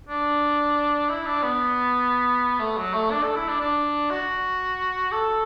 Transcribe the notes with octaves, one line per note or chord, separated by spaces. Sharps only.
D4
E4
D4
B3
A3
F#3
A3
D4
A4
E4
D4
D4
F#4
A4